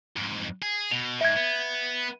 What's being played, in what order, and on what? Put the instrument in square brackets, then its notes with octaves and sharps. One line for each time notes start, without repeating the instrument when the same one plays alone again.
[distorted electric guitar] F2 G#2
G#4
[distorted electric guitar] B2 [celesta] F7
[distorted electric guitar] G#2 [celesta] E5 G#6
[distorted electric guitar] B3